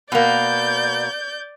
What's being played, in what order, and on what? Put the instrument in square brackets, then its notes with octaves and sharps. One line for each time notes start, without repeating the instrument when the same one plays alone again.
[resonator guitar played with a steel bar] B2 A#3 [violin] D5 G6